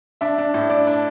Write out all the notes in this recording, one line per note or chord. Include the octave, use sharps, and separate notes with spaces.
D4 E5
D4
A2
D4 D5
D4